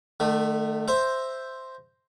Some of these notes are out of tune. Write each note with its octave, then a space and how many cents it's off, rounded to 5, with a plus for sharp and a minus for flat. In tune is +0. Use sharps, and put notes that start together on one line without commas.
D#3 -45 A3 +0
C5 +0 E5 +0 A#5 +0